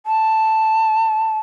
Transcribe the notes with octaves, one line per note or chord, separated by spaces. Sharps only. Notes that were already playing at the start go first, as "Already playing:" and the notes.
A5